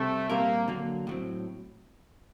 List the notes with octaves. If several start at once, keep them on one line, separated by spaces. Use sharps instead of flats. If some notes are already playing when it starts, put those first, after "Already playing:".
Already playing: C3 G3 A3 C4
A#2 G3 A#3 C4 G4 A#4
D3 F#3 A#3
A2 F#3 C4